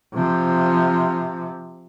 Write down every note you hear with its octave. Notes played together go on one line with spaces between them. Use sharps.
C3 F3